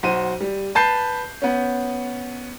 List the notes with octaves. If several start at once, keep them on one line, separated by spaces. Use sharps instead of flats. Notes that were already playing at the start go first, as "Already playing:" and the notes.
B1 F#4 C5 D#7
G3
B4 A5 G6 C7
B3 C#4